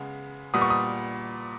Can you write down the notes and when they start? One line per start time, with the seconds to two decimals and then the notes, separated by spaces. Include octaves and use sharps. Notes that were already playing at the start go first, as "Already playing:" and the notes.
Already playing: C#3 G#3 B3
0.54 A#2 G3 B3 D#6
0.62 C#6
0.70 D#6